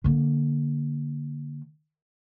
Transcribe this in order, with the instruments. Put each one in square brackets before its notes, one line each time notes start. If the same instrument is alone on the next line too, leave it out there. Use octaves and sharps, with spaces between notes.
[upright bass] D3 A#3